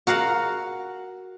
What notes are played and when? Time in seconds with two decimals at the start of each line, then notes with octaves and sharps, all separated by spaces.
0.07 F#4 A#4 F5 F#5